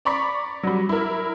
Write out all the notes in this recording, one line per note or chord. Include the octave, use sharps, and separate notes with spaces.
D5 A#5 B5 C#6 D6 B6
F#3 G3
E4 A#4